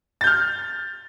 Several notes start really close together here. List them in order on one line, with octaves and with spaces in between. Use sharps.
A6 G6 F6